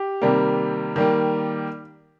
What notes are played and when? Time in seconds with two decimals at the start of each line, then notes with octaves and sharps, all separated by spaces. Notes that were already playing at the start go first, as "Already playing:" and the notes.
Already playing: G4
0.22 C3 D#3 G3 A#3
0.96 D#3 G3 A#3